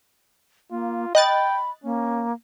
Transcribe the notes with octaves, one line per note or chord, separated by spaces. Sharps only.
A#3 F4
D#5 G5 B5 F#6 A6
A#3 C#4